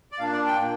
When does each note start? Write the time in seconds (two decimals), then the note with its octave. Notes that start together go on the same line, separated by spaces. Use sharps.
0.12 D5
0.19 A#2 A#3 D4 F5
0.32 D5
0.46 G5
0.60 A#2 A#3